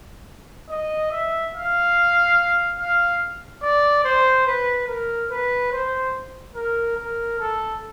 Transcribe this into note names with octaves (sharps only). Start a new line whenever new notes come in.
D#5
E5
F5
F5
D5
C5
B4
A#4
B4
C5
A#4
A#4
A4